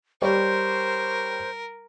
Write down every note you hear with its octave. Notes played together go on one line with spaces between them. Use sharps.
G3 A#4 C5 C#5